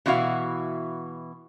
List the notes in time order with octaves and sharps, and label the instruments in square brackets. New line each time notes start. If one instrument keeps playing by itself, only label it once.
[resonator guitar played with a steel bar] B2 E3 E4 F#4 F5